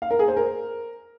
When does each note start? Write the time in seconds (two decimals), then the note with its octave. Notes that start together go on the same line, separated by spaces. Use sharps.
0.02 F5
0.11 A#4
0.19 G#4
0.28 C5
0.37 A#4